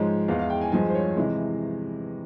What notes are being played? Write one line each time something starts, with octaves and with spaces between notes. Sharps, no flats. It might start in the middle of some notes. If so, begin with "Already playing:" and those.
Already playing: G#2 F3 G#3 C#5
E2 E3 G#3 F5
F5
G5
G#5
G2 F3 G#3 G#5
C5
C#5
C3 E3 G#3